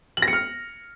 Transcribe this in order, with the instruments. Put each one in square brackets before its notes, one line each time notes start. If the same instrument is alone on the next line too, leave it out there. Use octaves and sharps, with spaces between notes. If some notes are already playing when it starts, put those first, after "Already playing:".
[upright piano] F#7
A#6
C#7
F6